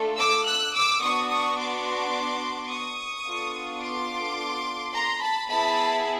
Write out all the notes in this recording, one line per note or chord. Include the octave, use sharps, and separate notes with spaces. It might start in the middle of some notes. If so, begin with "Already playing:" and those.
Already playing: A3 D4 F4 A4
D6 E6
E6 F#6
D6 E6
B3 D4 F#4 C#6 D#6
C#6 D#6
C6 D6
C#6 D#6
B3 D4 F4 A4
C6 D6
A#5 C6
A5 B5
B3 E4 G#4 A5 B5